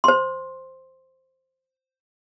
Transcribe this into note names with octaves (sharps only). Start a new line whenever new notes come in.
C5 C6